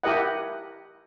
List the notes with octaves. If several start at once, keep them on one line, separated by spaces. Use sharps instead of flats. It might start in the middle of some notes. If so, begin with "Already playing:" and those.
E4 G4 A#4 D#5 F#5